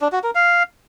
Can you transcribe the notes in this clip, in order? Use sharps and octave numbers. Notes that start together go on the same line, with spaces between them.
D4
F#4
A#4
F5